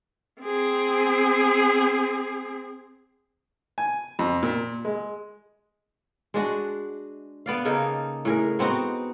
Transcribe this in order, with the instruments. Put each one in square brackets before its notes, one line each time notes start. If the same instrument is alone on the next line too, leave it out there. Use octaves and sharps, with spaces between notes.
[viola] C4 G#4
[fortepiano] G#5
F2
A#2
G#3
[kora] G#3 D4 F#4
B3 D5 F5
C#3 A#3 D#4 A4
A2 G#4 A#4
B3 C4 D#4 F#4